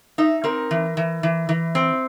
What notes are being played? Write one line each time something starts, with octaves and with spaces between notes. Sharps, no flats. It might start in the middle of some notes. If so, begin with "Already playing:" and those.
D#4 E5
C4 A#4
E3
E3
E3
E3
C4